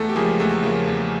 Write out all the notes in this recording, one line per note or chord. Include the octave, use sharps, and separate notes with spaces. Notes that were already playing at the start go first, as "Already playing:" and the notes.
Already playing: E2 A3 A4
G4
C#3 F3 G#3 A#3 G#4
E2 A3 A4
C#3 F3 A#3
E2